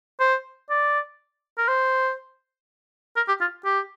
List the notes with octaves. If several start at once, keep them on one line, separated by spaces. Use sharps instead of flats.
C5
D5
A#4
C5
A#4
G4
F4
G4